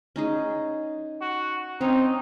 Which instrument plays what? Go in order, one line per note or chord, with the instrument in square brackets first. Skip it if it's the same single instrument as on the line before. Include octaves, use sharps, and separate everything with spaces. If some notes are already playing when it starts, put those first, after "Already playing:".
[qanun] C#4 D#4 G#4
[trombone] F#4
[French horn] C4 [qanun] C#4 C#5 F5 [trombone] D#4